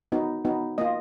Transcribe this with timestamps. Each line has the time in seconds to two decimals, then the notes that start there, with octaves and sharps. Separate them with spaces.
0.12 B3 D#4 F#4
0.45 B3 D#4 F#4
0.78 A#3 F4 D#5